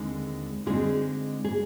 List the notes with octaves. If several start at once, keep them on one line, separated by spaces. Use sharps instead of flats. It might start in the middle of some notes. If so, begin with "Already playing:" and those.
Already playing: D#2 D3 G#3 C4 D#4
D3 G#3 C4 D#4 F4 G#4
G#4